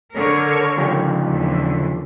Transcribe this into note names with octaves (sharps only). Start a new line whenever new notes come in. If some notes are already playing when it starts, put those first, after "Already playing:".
D3 A#4 C#5
C#3 F3 G4
D#2 D3 E3